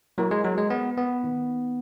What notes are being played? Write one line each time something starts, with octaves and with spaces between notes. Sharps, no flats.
F#3 A#3 E4 A#4 C#5
G#3
F#3
G#3
B3
B3
D#3 A#3 D#4